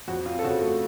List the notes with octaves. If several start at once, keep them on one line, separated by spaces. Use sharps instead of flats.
F2 F#4
C4 F4
A4
C#3 F#4
A3 F#4